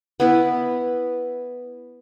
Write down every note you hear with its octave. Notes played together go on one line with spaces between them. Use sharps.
B3 E4 B4